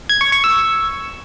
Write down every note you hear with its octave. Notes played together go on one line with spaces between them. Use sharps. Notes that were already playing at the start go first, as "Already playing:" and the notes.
G#6
C#6
C#6
E6